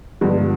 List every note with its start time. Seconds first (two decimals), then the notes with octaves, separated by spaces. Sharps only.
0.21 G2 D3 F3 G#3 B3